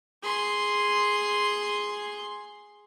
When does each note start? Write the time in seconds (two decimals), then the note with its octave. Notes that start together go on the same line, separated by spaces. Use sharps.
0.22 G#4 C6